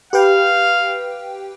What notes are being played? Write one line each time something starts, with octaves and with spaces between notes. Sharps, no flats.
G4 B4 F5 G5